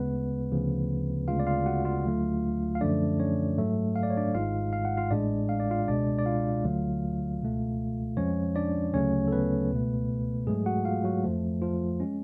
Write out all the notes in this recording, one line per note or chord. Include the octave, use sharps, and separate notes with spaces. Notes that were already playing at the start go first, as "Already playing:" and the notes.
Already playing: D2 C#3 G#3 B3 B4
D2 C#3 F3
D2 C#3 G#3 F4 F5
D5
F4 F5
F#4 F#5
F4 F5
D2 D3 F#3 A3
F5
F#2 D3 F3 A3 D4 D5
C#4 C#5
G#2 F#3 A3
F5
D5
C#5
D4 D5
G#1 G#2 G#3 F4 F5
F5
F#5
F4 F5
A1 A2 G#3 D4 D5
F5
D5
F4 F5
C#2 B2 G#3 D4 D5
D5
F4 F5
D2 D3 F#3 A3
C#2 B2 A3
F2 F3 G#3 C#4 C#5
D4 D5
D2 C#3 F#3 A3 C#4 C#5
A4
B3 B4
C#2 B2 A3
G#2 F#3 G#3 A3 G#4
F#4 F#5
F4 F5
F#3 F#4
F2 F3 A3
F3 F4
G#3 C#4